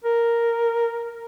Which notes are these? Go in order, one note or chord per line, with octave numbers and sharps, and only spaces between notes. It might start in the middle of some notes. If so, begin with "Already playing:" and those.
A#4